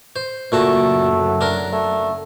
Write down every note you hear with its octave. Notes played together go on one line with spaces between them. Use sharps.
C5
F#1 A#2 F#3 A3 F#4 A5
D4 A#4
A3